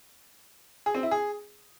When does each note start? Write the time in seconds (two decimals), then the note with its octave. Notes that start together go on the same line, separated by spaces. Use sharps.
0.86 G#4
0.95 C4
1.03 E4
1.11 G#4